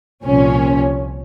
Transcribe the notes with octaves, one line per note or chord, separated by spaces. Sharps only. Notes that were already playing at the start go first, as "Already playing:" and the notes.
C2 A#2 F3 C#4